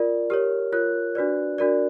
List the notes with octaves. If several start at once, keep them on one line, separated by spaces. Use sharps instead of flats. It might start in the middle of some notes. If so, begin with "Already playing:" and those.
Already playing: F4 A#4 D5
G4 A#4 C#5 F6
F4 A#4 C#5 F#6
D4 F#4 B4 D5
D4 F#4 A#4 D5